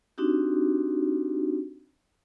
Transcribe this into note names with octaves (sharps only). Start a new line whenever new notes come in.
C4 D4 D#4 F#4 G4